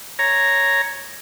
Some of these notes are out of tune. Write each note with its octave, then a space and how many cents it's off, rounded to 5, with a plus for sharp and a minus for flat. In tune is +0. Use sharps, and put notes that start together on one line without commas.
C#5 +0 A#5 +0